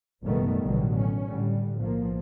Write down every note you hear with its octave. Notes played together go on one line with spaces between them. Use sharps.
F#1 B2 D#3 G3 A3 B3
A1 B2 D3 D#3 F#3 G3
C#4
A2 D3 G3
B1 F3 A#3